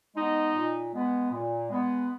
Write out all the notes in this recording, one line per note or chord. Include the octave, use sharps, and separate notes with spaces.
G#3 B3 D#4 D#5
A#2
G#3 B3
A#2
G#3 B3